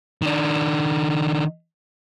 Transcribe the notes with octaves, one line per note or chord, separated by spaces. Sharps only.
D#3 D4